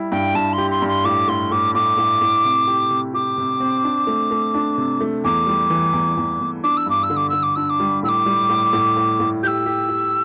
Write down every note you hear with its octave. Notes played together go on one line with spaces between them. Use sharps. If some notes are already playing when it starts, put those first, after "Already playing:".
Already playing: G3 E4
G2 G5
G2 A5
C6
G4
C6
G2
C6
A2 D6
A2 C6
A2 D6
A2 D6
A2
A2
C3
G4
C3
G4 D6
C3
C4
D4
A3
A3
D4
C3
A3
E2 D6
G3
E3
E2
E2
E2
D4 D6
E6
G2 D6
E6
D3
D6
D3 E6
D6
D4 E6
D6
G3
A2 E6
D6
G3
A2
A2
A2
A2
G4 E6 G6
G4
G4